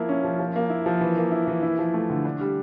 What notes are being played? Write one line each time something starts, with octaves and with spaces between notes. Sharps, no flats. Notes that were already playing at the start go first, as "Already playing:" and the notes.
Already playing: F3 A#3 E4
C#4
F3
F3
A#3
E4
F3
E3
A#3
E4
E3
E4
F3
A3
D3
D4
G3